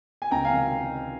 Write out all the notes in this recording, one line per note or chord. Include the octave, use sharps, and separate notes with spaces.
G#5
C#2 G5 A#5
F5 G#5
C3 D#3